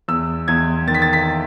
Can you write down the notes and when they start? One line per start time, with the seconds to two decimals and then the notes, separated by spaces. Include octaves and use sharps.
0.08 E2 E6
0.48 E2 G#6
0.88 D#3 A6
0.94 B6
1.02 A6
1.13 B6